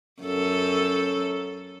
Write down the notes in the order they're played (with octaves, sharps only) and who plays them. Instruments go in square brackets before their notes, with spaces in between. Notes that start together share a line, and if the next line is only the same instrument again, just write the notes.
[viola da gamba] F#2 A4